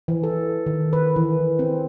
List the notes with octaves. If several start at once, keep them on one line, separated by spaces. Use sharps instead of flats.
E3
A4
D#3
B4
E3
C4